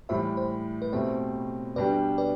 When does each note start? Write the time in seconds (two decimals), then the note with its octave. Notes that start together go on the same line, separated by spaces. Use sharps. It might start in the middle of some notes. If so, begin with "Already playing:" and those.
0.09 A2 E3 G3 C5 E5
0.37 C5
0.82 B4
0.92 B2 A3 C4 G4 C5
1.76 B2 G3 D4 G4 B4 D5
2.18 B4 D5